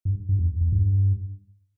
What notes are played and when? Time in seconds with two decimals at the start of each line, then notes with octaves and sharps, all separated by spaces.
0.05 G2
0.29 G2
0.39 E2
0.61 E2
0.72 G2